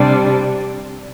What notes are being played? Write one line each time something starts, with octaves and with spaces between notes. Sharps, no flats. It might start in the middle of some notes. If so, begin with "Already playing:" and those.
Already playing: C3 G3 D4